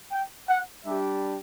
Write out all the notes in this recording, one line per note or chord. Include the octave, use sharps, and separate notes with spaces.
G5
F#5
G3 D4 G4 E5